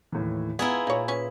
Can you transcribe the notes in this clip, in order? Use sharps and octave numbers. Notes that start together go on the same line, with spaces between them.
D#2 A2 E3
B3 E4 F4 G#4 B4 F#5 A#5
A#2 D#4 C#5
C#4 B4